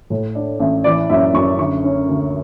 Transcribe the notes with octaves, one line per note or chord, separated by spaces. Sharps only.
A2
D4
A1
E3 D5
F#2 E5
F#2 C#6
D3 C#6
C#4
D2